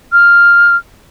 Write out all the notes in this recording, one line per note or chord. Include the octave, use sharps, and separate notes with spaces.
F6